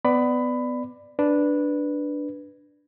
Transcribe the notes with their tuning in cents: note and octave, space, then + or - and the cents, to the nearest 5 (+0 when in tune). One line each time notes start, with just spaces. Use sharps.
B3 +20 D5 +10 B5 +20
D4 +0 B4 +0